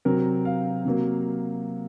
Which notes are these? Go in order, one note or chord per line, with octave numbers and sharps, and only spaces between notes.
C3 F#3 C4 A#4
F5
C3 F#3 A#3